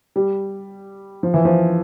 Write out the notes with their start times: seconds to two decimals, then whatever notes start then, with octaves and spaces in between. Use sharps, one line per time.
0.16 G3
1.23 F3
1.34 E3
1.45 F3